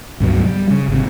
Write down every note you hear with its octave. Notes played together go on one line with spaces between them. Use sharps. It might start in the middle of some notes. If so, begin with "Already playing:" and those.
C#2 G2 B2 F#3
G3
C#3
G#1 C3